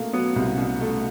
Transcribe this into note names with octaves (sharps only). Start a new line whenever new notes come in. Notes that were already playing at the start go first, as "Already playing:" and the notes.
Already playing: B2 A3 A#3
F#3 B3
C2
B2
A3